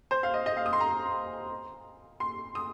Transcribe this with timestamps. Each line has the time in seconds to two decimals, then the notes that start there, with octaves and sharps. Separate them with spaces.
0.11 C5
0.23 F5
0.34 D#5
0.46 D#5
0.57 F5
0.66 D#6
0.73 C6
0.81 A#5
2.20 C6
2.55 D#6